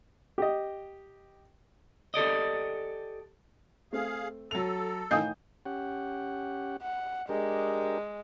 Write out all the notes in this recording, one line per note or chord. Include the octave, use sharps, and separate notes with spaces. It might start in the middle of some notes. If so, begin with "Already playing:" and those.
G4 D#5
G4 A4 D5 D#5
A3 C4 G#4 F5
F#3 A4 F7
A2 D#3 E3 D#5 F5 G#5 D#6 G6
C#4 G4 F#5
F#5
G#3 D4 G4 A#4